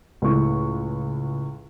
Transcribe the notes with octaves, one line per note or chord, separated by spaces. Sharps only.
C#2 A2 C#6